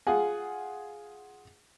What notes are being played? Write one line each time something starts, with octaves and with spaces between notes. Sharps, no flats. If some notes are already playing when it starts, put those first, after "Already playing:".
F4 G#4 F#5 G#5